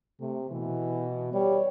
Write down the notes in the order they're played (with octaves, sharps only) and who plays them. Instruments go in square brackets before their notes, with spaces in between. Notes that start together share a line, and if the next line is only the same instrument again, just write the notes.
[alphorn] C3 [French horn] A3
[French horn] B2 [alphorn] E3
[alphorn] G3 [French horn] C#5